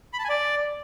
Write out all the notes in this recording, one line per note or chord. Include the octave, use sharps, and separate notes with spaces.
B5
A5
G#5
D5